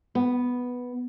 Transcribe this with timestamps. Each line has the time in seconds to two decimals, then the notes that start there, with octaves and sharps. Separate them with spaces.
0.15 B3